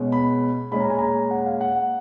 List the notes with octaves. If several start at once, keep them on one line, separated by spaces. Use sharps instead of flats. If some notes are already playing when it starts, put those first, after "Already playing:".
Already playing: B2 G#3 C#4
B5
A#2 G#3 C#4 B5
A#5
G#5
A#5
F#5
F5
F#5